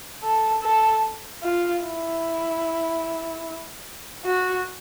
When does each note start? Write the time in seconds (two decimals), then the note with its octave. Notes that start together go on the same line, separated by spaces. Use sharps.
0.23 A4
0.62 A4
1.43 F4
1.84 E4
4.25 F#4